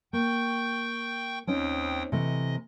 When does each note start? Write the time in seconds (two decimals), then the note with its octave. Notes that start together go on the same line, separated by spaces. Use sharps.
0.13 A#3 G5 C#6 G6
1.47 D#2 C4 C#4 D#4 G5 D#6
2.12 C3 E3 A3 D#5